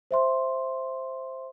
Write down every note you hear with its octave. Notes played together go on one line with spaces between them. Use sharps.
C5 E5 C6